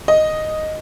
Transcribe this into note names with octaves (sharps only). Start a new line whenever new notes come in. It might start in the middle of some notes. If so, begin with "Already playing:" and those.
D#5